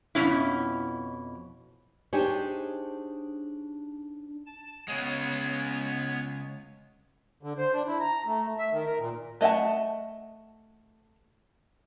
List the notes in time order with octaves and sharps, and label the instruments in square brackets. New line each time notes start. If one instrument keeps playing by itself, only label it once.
[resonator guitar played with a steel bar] F2 G#2 B2 C#4 E4
[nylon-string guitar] D4 D#4 G4 G#4 C5 C#5
[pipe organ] A5
[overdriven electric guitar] C#3 G#3 [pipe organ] B3 C#5
[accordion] D3
C5
D4
E4
A#5
A3
E5
D#3
A#4
A#2
[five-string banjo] A3 D#5 E5 F#5 A5